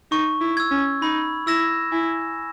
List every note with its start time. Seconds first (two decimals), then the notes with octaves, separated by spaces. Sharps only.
0.12 D#4 C#6
0.41 E4
0.57 E6 G#6
0.71 C#4
1.02 D#4 B5
1.47 E4 E6 A#6 E7
1.92 E4 G#5